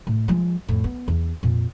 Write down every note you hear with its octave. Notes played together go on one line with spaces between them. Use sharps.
A2
F3 G#3
F2 A2
B3
E2
F2 A#2